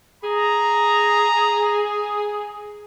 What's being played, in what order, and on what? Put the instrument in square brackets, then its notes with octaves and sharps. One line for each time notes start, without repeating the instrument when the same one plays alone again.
[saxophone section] G#4 [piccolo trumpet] A#5